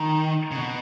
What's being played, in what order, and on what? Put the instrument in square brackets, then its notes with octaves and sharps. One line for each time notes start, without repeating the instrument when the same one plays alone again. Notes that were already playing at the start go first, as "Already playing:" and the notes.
Already playing: [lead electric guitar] D#3 [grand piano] A#5
[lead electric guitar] C#3
B2